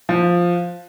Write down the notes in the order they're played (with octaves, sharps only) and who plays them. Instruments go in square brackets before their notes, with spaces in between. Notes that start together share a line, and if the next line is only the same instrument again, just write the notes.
[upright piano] F3